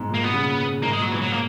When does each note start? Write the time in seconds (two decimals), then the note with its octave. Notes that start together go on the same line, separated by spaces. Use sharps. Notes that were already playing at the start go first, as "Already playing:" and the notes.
Already playing: G#2 B2
0.09 A#2
0.14 A#3
0.23 B2 B3
0.34 C#3
0.43 A#2
0.82 G#2 A#3
0.92 G#3
0.97 A#2 F#3
1.11 B2 E3
1.21 F#3
1.32 A#3